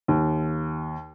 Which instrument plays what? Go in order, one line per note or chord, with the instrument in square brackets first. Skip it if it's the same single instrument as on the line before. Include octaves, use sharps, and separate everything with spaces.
[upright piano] D#2